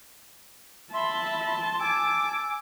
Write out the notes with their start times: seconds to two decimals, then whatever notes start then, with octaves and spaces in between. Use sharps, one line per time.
0.94 E5 A5 B5 C6
1.80 G#5 D6 E6